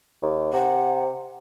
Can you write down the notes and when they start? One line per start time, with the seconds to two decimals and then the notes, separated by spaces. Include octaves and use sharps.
0.22 D#2
0.53 C3 F#5